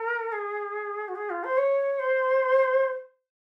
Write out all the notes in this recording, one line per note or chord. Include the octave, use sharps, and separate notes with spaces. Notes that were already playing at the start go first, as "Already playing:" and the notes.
Already playing: A#4
G#4
F#4
G#4
F4
C5
C#5
C5